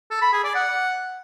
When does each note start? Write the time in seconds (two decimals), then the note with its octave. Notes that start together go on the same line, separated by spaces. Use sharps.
0.11 A4
0.22 B5
0.33 G#4
0.44 D5
0.55 F#5